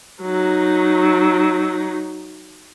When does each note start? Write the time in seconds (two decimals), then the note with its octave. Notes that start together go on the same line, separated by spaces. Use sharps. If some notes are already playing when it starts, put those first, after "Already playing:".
0.22 F#3 D#4